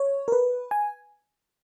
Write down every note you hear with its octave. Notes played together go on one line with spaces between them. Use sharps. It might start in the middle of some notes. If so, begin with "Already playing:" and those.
Already playing: C#5
A#4
B4
G#5